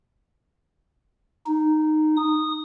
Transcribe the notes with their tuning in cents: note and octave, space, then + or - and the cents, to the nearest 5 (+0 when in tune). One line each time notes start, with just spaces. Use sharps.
D#4 -10
D#6 -10